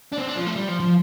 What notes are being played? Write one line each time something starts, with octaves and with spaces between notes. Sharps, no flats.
D4
C4
D4
F3
A3
G3
F3
F3